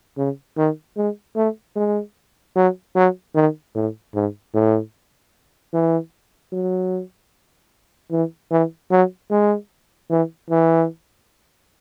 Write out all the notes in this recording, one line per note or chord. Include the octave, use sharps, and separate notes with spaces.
C#3
D#3
G#3
A3
G#3
F#3
F#3
D#3
A2
G#2
A2
E3
F#3
E3
E3
F#3
G#3
E3
E3